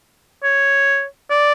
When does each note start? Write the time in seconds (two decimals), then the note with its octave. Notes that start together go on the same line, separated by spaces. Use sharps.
0.44 C#5
1.30 D5